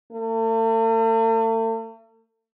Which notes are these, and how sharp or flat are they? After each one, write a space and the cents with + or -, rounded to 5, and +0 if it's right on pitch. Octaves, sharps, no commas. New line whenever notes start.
A3 +40